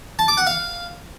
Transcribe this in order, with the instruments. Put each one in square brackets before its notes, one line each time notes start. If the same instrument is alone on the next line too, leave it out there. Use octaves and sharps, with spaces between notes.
[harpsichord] A5
D6
F#5
F5